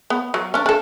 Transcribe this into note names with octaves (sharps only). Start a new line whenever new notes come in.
B3
F#3
C#4 D4
D4 A4